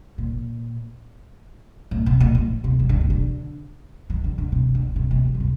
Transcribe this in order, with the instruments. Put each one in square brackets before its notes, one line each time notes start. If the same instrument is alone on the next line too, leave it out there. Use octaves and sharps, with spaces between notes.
[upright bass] A#2
A2
C3
A#2
A2
C3
E3
D3
C3
D3
E3
D3
D3
C3
D3
C3
C3
D3
A#2
C3